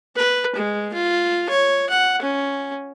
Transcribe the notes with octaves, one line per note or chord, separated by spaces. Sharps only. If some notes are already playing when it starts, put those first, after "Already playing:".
B4
G#3
F4
C#5
F#5
C#4